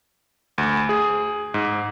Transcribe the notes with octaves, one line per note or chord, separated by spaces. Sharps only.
D2
G#4
G#2